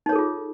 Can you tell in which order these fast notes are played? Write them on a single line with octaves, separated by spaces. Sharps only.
D#4 C#5 A4 G#4 F4